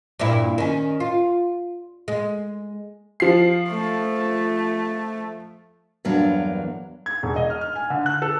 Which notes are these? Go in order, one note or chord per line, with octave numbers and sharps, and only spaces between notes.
G2 A#2 E4
D#3 C#4
F4
G#3
F3 C7
A3
E2 G2 F#3 A#3 A5
G#6
E1
D#5
F6
F6
G#5
D3
F#6
A4